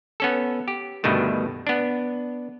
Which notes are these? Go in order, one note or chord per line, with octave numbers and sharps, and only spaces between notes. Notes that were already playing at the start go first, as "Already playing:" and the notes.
B3 C#4 A4
G4
D2 G2 B2 D#3 A3
B3 D4